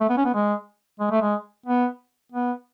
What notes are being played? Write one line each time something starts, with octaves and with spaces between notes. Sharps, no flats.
A3
B3
C#4
B3
G#3
G#3
A3
G#3
B3
B3